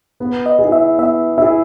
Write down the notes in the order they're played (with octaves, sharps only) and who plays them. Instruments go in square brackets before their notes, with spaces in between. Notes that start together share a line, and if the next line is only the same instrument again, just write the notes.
[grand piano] B3
[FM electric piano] D#5
[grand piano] G#4
E4
[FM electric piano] E5
[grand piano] B3 [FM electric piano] E5
[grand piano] E4 G#4 [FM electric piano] E5